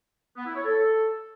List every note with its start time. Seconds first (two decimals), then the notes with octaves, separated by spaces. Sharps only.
0.37 B3
0.46 E4
0.56 C#5
0.65 A4